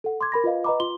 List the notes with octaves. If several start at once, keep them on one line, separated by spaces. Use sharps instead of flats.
A4 F#5
C6 D6 G#6
A#4 B5 A#6
F4 B4 D#5 F5
B4 D#5 F#5 A#5 B5 D6
F4 C6 G7